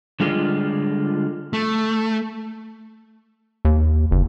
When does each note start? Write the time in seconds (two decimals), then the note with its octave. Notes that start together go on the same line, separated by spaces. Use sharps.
0.20 D3 G3 G#3 F4 A4
1.53 A3
3.65 D#2
4.11 F#1